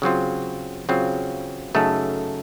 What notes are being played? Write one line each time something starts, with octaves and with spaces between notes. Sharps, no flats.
C#3 F#3 C4 F4
C#3 F#3 C4 F4
F#2 C#3 A3 D#4 A4